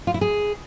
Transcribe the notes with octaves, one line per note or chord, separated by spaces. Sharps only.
F4
E4
G#4